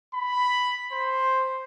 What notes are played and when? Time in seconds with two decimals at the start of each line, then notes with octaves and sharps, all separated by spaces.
0.14 B5
0.92 C5